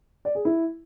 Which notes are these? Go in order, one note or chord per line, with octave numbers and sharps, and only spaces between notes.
D5
G#4
E4